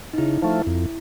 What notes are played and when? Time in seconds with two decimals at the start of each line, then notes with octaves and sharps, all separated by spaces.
0.13 D#4
0.18 C#3 E4
0.42 F3 A3
0.67 F2